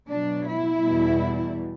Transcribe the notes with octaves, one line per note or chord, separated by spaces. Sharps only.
B2 F#3 D4
E4
E2 B2 G3